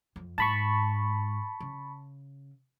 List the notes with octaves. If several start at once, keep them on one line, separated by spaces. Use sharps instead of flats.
F2
G#2 A5 B5 C#6
C#3